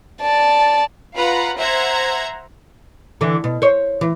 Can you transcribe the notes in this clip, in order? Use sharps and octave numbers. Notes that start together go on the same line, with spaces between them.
D5 A5
F4 B4 F5 F#5 A#5 B5
C5 E5 F#5 A#5 G#6 A#6
D3 E3
B2
C5 C#5
E3